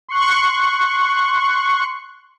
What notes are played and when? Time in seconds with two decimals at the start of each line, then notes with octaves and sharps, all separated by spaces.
0.09 C6 C#6 F#6